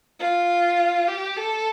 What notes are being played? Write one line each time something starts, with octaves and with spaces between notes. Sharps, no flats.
F4
G4
A4